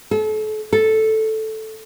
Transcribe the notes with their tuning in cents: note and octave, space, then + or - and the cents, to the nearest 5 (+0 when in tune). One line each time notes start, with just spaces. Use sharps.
A4 -35
A4 -5